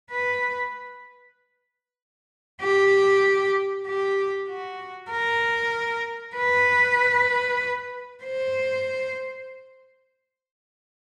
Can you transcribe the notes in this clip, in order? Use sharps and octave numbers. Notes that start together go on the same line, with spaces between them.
B4
G4
G4
F#4
A#4
B4
C5